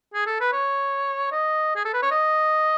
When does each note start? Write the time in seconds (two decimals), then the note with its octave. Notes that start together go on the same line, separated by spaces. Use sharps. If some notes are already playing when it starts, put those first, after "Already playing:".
0.14 G#4
0.27 A4
0.41 B4
0.53 C#5
1.32 D#5
1.76 G#4
1.85 A4
1.94 B4
2.02 C#5
2.11 D#5